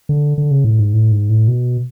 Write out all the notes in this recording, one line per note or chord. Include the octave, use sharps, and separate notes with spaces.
D3
D3
C#3
A2
G#2
A2
G#2
A2
B2